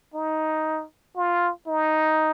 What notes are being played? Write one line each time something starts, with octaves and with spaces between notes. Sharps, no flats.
D#4
F4
D#4